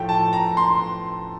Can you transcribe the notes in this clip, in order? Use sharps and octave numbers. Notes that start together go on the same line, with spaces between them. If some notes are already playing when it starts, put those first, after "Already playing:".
Already playing: A2 F3 A3 G5
A5
A#5
C6